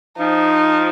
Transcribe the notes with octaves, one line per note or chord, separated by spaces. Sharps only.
F3 D#4